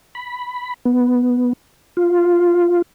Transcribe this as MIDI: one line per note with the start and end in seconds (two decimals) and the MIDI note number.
0.15 0.74 83
0.85 1.53 59
1.97 2.82 65